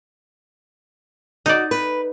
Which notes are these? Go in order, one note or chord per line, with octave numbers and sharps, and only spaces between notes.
D#4 F#4 D5 D#5
B4